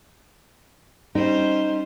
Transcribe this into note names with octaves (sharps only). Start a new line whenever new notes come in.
G3 C#4 D#4 C5